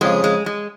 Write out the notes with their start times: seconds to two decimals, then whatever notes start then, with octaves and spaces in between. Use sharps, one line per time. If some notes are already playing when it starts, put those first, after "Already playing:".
0.01 F2 C#3 F3 G#3
0.24 G#3
0.46 G#3